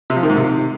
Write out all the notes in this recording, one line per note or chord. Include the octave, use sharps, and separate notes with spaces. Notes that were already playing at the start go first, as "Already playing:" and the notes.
C3
F3
D#3
G#2
C3